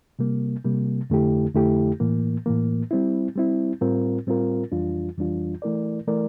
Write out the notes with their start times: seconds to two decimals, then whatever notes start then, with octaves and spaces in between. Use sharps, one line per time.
0.19 C3 G3 A#3
0.64 C3 G3 A#3
1.10 F2 D3 A3 E4 G4
1.55 F2 D3 A3 E4 G4
2.00 A2 E3 A#3
2.46 A2 E3 A#3
2.91 G3 C4 E4
3.36 G3 C4 E4
3.81 A2 G3 C4 F4 A#4
4.27 A2 G3 C4 F4 A#4
4.72 F2 E3 G3 D4 F4
5.17 F2 E3 G3 D4 F4
5.62 E3 A3 E4 A#4 D5
6.08 E3 A3 E4 A#4 D5